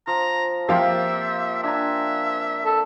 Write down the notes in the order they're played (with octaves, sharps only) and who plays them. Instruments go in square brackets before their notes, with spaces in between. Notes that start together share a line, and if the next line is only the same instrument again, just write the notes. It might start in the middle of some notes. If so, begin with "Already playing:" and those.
[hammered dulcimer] F3 [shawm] A#5
[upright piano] F3 F4 [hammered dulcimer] A#3 C4 G4 [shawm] E5
[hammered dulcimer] D4 G#5 A#5 [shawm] E5
[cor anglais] A4